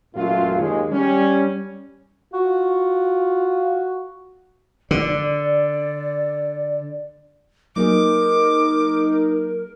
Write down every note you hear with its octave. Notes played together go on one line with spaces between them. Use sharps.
A1 F#2 A#2 F#3 A3 F4
D#2 G#3
G3 C#4
F4 F#4
D3 D5
F#3 A#3 D#4 G#4 A#4 D6